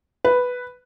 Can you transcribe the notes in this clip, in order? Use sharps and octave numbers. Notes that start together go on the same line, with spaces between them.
B4